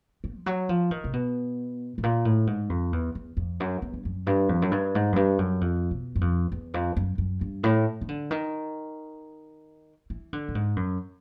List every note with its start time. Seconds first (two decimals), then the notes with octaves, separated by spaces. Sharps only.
0.24 C4
0.35 F3
0.46 F#3
0.69 F3
0.91 D#3
1.04 C3
1.13 B2
1.98 A2
2.03 A#2
2.25 A2
2.47 G#2
2.69 F2
2.93 E2
3.15 E2
3.37 F2
3.60 F#2
3.82 E2
3.93 G2
4.05 F#2
4.27 G2
4.49 F2
4.62 F#2
4.71 G2
4.95 G#2
5.12 F#2
5.16 G2
5.38 F#2
5.61 F2
5.91 B2
6.15 F#2
6.21 F2
6.52 E2
6.74 F2
6.97 F#2
7.18 F#2
7.41 G2
7.63 A2
8.01 D#3
8.08 D3
8.31 D#3
10.10 E3
10.33 D3
10.48 A2
10.55 G#2
10.76 F#2